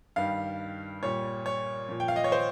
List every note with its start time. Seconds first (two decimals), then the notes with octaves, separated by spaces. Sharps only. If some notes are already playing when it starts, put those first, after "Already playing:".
0.16 G2 D#3 G3 F5
1.03 A#2 G3 C#5
1.46 C#5
1.89 A#2 F3
2.00 G5
2.08 F5
2.16 D#5
2.24 C#5
2.32 C5